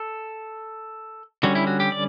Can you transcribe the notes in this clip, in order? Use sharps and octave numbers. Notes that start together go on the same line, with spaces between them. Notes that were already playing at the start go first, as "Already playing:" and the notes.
Already playing: A4
D3 G3 C#4 F#4
E4
F#4
G4
D5